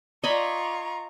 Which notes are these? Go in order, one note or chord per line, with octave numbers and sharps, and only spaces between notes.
F4 D5 D#5 G#5 A#5 B5 C#6